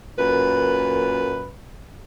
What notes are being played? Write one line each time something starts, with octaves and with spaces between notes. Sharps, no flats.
F#2 A#2 B4